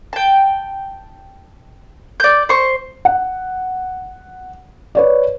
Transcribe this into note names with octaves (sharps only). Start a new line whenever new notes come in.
G5 A5
D5 G6
C5 C#6
F#5
B4 C#5 D5